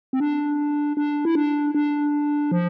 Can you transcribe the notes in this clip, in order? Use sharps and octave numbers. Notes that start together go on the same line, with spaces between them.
C4
D4
D4
E4
D4
D4
F3